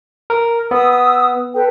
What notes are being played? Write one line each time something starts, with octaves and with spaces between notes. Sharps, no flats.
A#4
B3 D#6 E6
A4 B4 G5